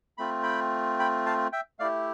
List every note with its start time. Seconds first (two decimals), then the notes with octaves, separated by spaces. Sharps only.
0.18 A3 C4 F4 B5
0.43 G5 B5
0.99 G5 B5
1.26 F5 A5
1.52 E5 G5
1.79 A3 E4 G4 D5 F5